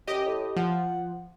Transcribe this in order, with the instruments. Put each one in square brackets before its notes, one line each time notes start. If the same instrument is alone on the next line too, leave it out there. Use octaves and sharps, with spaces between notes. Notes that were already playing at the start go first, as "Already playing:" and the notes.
[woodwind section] F#2 [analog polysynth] G4 D#5
[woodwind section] A2
[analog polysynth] F3 [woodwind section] F#5